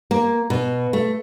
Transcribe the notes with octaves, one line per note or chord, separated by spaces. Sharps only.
A#3
B2
A3